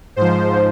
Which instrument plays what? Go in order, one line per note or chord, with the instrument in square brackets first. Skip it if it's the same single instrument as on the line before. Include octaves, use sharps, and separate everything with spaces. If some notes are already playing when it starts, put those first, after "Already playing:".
[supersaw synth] G#2 F3 C5